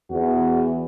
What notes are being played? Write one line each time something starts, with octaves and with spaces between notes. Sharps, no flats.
E2 F#4